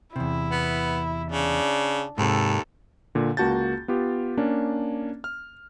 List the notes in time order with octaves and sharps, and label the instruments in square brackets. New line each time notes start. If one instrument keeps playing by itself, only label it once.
[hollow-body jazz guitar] E2 C3 [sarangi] E4
[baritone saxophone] B3
[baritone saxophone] C#3 [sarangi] D4
[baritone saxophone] D#2 [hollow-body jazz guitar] G#2 C3 [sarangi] A4
[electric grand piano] A#2 D3
C#2 A#3 F#4 A5 G6 A6
B3 F4 G4
A#3 C#4 D4
F6